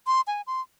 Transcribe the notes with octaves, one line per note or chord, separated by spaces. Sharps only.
C6
G#5
C6